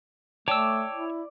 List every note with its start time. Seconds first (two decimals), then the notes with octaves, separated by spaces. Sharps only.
0.48 A3 C#5 D5 G5 A5 E6
0.94 E4